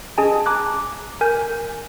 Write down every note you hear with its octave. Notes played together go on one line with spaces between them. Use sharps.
C#4 G#4 D#5 G#5 A5
A5 A#5 D6 F#6 G#6
A#4 G#5 G6